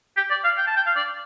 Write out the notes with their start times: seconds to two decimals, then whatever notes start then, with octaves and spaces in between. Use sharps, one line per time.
0.17 G4
0.31 D5
0.44 F5
0.57 G5
0.67 A5
0.76 G5
0.86 F5
0.96 D5